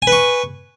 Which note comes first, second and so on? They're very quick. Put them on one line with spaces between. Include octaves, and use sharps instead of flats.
G#5 B4 C#6